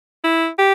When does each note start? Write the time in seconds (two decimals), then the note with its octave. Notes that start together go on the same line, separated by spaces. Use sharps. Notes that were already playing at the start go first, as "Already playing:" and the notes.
0.24 E4
0.59 G4